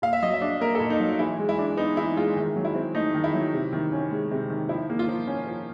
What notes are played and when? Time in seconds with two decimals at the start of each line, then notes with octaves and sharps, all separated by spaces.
0.02 A#2 F5
0.13 E5
0.23 F#3 D#5
0.33 E5
0.42 D4
0.60 A#3 A#4
0.75 A4
0.80 A#2
0.90 D#4
1.00 F#3
1.19 E3 E4
1.39 G#3
1.49 E4
1.59 D4
1.77 B3 D#4
1.97 E3 E4
2.16 G#3 F4
2.37 D#3
2.56 F#3
2.65 E4
2.75 C4
2.95 A3 D#4
3.14 D#3
3.24 E4
3.33 F#3
3.53 C3
3.73 D#3
3.92 C#4
4.11 G#3
4.31 C3
4.50 D#3
4.69 F3 E4
4.90 A#3
4.99 F4
5.08 F3
5.27 C#4
5.47 F3